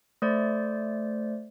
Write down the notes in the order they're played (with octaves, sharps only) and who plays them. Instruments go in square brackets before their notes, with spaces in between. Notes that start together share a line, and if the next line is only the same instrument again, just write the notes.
[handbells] A3 C5 D5